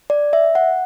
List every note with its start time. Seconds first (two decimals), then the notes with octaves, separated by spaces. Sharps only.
0.10 D5
0.33 E5
0.55 F#5